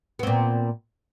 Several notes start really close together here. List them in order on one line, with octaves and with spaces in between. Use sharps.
B3 C4 A#2